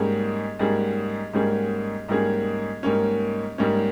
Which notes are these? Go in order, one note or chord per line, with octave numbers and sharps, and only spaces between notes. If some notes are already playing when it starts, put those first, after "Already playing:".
Already playing: G#2 G3 A#3 C#4 G#4
G#2 G3 A#3 C#4 G#4
G#2 G3 A#3 C#4 G#4
G#2 G3 A#3 C#4 G#4
G#2 G3 A#3 C#4
G#2 G3 A#3 C#4